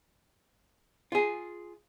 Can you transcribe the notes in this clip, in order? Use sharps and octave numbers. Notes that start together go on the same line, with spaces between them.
F4 G#4